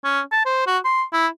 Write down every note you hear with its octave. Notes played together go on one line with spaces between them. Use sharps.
C#4
A5
C5
F#4
C6
E4